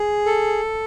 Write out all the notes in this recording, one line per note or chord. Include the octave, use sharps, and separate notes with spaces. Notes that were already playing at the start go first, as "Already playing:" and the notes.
Already playing: G#4
A4